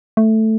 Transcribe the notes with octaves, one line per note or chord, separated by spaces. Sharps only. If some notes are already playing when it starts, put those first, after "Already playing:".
A3